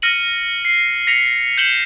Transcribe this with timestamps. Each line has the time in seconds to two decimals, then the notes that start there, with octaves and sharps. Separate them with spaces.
0.02 F6 A#6 C#7 D#7 F#7
0.65 C7
1.07 A#6 B6 C#7 F7
1.58 G6 C#7 E7 F#7 G7